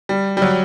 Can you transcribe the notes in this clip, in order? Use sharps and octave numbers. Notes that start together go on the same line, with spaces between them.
G3
G3
F#3